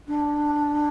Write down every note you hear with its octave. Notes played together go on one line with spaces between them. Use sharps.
D4